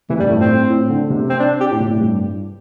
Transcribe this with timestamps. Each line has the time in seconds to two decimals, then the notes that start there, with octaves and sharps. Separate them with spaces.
0.09 C3 E3
0.19 G2 G3
0.29 A2 A3
0.39 A2 C4
0.70 A2
0.89 D3
1.10 C3
1.29 C4
1.39 D4
1.60 G4
1.71 A2
1.80 C3
1.90 A2
2.00 G2